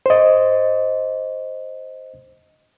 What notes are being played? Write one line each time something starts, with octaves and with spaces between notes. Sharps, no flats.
C5 D#5